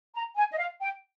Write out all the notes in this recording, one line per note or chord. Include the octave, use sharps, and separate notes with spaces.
A#5
G#5
D#5
F5
G5